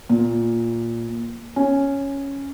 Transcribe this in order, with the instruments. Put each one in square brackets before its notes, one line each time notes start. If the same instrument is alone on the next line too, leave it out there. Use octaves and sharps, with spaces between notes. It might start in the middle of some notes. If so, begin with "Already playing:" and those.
[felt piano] A#2
C#4